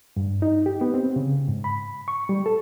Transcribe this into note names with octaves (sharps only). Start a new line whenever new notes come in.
G2
D#4
G4
B3
C4
C#3
G#2
B5
C#6
G3
A4